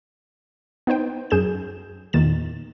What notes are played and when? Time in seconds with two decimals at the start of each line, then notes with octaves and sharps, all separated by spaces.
0.87 B3 D#4 C5 G5
1.30 F#2 G#4 G6 E7
2.13 E2 A#2 D#3 A6 E7